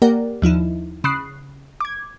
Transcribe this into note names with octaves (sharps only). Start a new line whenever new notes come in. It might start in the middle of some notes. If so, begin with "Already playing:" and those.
A#3 G4 A#4 D5 F#5
D#2 F3 D#4 E4
C#3 B5 D#6 F#6 C7
D6 G#6